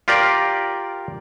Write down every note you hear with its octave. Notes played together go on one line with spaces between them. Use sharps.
F4 G4 A#4 D5